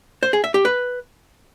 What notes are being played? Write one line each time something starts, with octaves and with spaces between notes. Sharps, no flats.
C5
G#4
E5
G4
B4